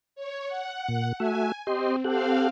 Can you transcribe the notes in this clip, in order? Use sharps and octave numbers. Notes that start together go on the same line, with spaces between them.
C#5
F#5
A#2
A3 F#4 E5 G#5
C4 G4 D#5 C6
C4 G4 A4 F5 F#5